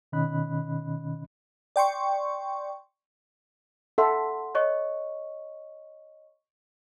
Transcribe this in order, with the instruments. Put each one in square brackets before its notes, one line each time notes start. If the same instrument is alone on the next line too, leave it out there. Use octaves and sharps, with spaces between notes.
[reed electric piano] B2 D#3 C#4 D#5 B5 F#6
[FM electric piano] D5 G5 C6 C#6
[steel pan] A4 E5 [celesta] F#5 C6
[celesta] C#5 D#5 C#6